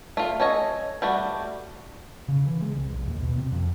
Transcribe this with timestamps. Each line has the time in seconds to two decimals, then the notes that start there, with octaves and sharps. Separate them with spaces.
0.17 A3 F4
0.40 C#4 A4 C#5 D#5
1.02 G3 A3 F#4
2.28 C#3
2.46 E3
2.62 G#3
2.77 C2
2.92 A#1
3.07 D#2
3.22 B2
3.38 C3
3.52 F2